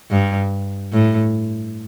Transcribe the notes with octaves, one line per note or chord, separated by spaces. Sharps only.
G2
A2